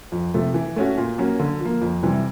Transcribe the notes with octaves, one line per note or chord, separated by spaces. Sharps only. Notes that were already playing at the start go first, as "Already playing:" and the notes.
F2
C3 F3 A3
E3
A3 C#4 F#4
A#2
F#3 A#3 C#4 F#4
D3
F3 A#3
F2
C3 E3 G3